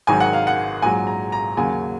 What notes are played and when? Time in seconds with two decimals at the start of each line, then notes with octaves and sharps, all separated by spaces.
0.07 G#1 G#2 D#3 F#3 G#5
0.20 F#5
0.33 F5
0.47 F#5
0.82 A#1 G#2 F#3 G#5
1.07 A#5
1.32 A#5
1.57 D#2 C#3 F#3 G#5